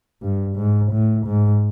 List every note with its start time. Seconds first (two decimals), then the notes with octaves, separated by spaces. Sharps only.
0.22 G2
0.56 G#2
0.92 A2
1.26 G#2